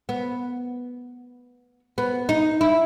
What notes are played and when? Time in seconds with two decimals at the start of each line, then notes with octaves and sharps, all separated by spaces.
0.09 B3
1.98 B3
2.29 D#4
2.61 E4